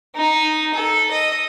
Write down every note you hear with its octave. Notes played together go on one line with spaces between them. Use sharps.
D#4
A4
D#5